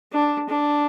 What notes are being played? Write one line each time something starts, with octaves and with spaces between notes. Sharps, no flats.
D4
D4